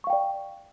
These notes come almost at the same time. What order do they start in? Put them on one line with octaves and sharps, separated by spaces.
C#6 F5 G5 D5